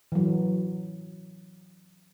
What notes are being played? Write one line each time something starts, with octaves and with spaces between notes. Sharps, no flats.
E3 F#3